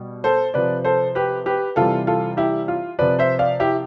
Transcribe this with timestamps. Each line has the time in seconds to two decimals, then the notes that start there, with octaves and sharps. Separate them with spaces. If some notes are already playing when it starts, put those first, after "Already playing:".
Already playing: B2 G3
0.24 A4 C5
0.54 C3 F3 B4 D5
0.85 A4 C5
1.15 G4 B4
1.46 G4 B4
1.76 C3 E3 G3 F4 A4
2.07 F4 A4
2.37 E4 G4
2.68 F4
2.99 C3 F3 B4 D5
3.19 C5 E5
3.39 D5 F5
3.60 E4 G4